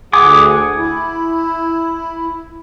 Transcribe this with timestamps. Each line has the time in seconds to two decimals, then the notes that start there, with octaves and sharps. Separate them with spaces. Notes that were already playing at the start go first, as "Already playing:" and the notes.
0.13 D2 G#4 F#5 G#5 D6 D#6
0.77 E4